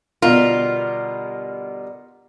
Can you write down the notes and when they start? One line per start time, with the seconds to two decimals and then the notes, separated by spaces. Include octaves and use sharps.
0.22 B2 D3 G3 B3 F4 A#4